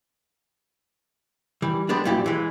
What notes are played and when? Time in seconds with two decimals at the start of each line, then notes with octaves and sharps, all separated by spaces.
1.62 E3 G3
1.89 G3 G#3 B3 D4
2.05 F#2 A#2 E4 G4 D5
2.26 E3 G#3